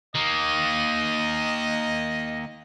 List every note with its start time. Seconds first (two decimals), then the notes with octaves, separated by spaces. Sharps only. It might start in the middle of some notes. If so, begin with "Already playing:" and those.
0.15 D#3 A#3 D#5